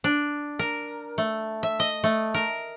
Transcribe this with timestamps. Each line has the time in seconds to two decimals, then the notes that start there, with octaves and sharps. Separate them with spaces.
0.04 D4
0.59 A#4
1.18 A3
1.63 E5
1.80 D#5
2.04 A3
2.34 A#4